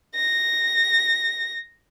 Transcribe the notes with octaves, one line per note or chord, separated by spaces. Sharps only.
A#6